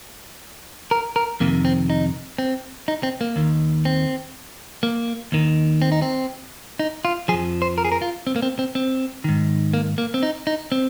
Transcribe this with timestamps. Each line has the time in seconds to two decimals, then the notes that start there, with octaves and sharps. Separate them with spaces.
0.91 A#4
1.16 A#4
1.40 F2 C3 D#3 A#3
1.65 C4
1.90 D#4
2.38 C4
2.88 D#4
3.03 C4
3.21 A#3
3.36 D#2 D#3
3.85 C4
4.83 A#3
5.32 D#2 D#3
5.82 C4
5.92 D#4
6.02 C4
6.79 D#4
7.05 F4
7.28 F3 G#4
7.33 F2
7.62 C5
7.78 A#4
7.85 G#4
7.92 A#4
8.02 F4
8.27 C4
8.36 A#3
8.42 C4
8.59 C4
8.75 C4
9.24 G#2 D#3
9.74 A#3
9.98 A#3
10.14 C4
10.23 D#4
10.47 D#4
10.72 C4